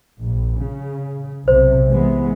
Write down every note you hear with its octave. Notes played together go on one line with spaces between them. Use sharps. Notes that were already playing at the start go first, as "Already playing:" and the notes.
A#1
C#3
B1 C3 C5
E3 G#3 B3